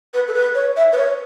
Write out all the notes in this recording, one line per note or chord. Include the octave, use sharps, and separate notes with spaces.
B4
A4
B4
C#5
E5
B4
C#5